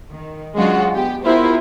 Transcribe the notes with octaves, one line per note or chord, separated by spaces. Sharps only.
D#3
F#3 G#3 C#4 D4 F4 F#4
B3 G4
B3 E4 F4 G4 A#4 C5